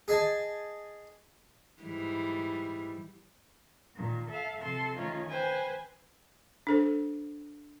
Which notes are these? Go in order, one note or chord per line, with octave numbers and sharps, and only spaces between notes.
G#4 D#5 G#5 A5
G#2 E3 G3
A#2 D#3
A4 E5 F5
C3 F3 A4 C6
D#3 E3 A3 C#4 D#4 F4
B4 C5 G5 G#5
D4 A4 C5